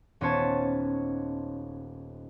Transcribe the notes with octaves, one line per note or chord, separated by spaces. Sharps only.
D#1 B3 C#4 C5 C#5 A5